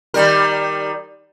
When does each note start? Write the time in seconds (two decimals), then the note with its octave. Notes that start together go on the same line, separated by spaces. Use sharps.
0.14 D#3 G3 A#4